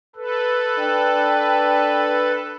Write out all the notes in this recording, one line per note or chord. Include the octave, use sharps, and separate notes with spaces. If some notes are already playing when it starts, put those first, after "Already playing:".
A4 B4
D4 G5